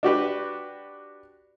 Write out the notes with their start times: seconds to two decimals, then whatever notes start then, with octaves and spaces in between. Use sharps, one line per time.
0.03 D4 F#4 G4 B4